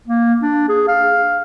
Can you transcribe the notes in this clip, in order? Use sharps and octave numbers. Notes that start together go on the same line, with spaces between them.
A#3
D4
G#4
F5